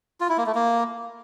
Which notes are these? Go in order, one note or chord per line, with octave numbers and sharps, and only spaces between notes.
F4
E4
A#3
A3
A#3